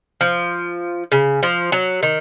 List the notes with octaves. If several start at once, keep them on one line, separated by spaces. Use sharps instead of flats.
F3
C#3
F3
F#3
D#3